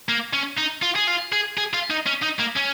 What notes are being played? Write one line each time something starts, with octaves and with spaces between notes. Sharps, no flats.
A#3
C#4
D#4
F4
G#4
F4
G#4
G#4
F4
D#4
C#4
D#4
A#3
C#4